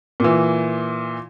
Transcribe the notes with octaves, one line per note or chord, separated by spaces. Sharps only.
A#2 E3